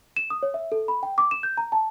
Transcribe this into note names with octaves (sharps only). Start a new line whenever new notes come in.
E7
D#6
C#5
E5
A4
B5
G5
D6
E7
G6
A#5
A5